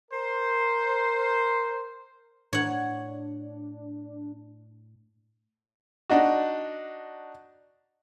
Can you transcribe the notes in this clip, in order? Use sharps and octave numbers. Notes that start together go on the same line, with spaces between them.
A#4 C5
A2 D4 C#5 F#5
D4 D#4 F#4